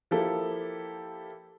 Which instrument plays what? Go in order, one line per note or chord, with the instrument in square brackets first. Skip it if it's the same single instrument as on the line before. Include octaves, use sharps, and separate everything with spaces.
[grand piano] F3 A#3 E4 G4 A4